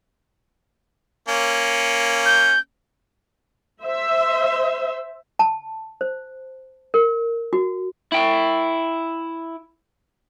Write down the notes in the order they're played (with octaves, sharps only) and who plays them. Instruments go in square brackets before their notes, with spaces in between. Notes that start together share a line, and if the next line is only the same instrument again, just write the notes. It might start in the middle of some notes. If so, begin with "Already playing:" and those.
[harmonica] A#3 C#4
[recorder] G6
[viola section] C5 E5
[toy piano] A5
C5
A#4
F#4
[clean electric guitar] E4 G5